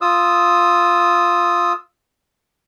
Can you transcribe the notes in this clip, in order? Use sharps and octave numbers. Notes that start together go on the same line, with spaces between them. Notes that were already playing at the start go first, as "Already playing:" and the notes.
F4 D#6 E6